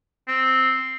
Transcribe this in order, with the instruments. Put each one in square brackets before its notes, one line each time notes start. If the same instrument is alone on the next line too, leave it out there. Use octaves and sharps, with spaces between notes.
[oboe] C4